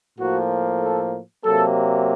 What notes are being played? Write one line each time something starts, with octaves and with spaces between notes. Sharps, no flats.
A2 F3 A#3 F#4
A4
C3 F#3 A#3 A4